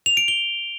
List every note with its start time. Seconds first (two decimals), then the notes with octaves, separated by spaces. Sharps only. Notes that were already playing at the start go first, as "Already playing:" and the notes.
0.06 F7
0.17 D7
0.28 G7